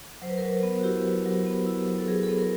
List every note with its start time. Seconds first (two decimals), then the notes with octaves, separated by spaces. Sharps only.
0.22 F#3 C5
0.29 B4
0.38 A#4
0.42 F#3 B4
0.53 A#4
0.63 B3
0.79 F#4
0.83 E4 G4
1.05 F#3
1.25 F#3
1.46 B3
1.66 E4
1.87 F#3
1.98 A4
2.08 F#3 G#4
2.23 A4
2.29 B3
2.39 A#4